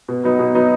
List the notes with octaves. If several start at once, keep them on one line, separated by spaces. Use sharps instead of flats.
B2
F#3 B3 D#4
B2
F#3 B3 D#4